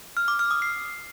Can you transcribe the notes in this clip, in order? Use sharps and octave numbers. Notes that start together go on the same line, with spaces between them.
F6
D6
F6
D#6
C7